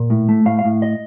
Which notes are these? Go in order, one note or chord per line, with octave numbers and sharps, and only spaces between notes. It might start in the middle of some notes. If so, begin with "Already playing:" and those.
Already playing: A#2
A2
A3
A2 F5
F5
A2
D#5